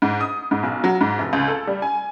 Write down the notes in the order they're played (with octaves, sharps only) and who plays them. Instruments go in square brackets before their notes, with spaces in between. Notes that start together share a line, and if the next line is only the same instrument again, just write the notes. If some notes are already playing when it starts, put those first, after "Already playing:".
[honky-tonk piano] G#2
D#6
G#2
B1
F#3
G#2
F1
C#2
A4
G3
G#5